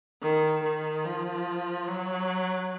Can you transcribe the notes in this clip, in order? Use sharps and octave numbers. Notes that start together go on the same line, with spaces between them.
D#3
D#3
F3
F#3